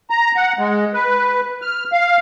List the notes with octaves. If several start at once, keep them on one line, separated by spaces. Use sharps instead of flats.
A#5
F#5
G#3
B4
F6
F5